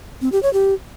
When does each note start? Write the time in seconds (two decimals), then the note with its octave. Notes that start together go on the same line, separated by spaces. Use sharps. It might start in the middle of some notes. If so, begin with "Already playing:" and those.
0.22 C4
0.32 G4
0.43 C#5
0.53 G4